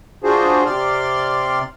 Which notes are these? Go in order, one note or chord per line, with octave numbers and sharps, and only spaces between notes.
D4 F4 F#4 G#4 C5
C3 D5 C6 F6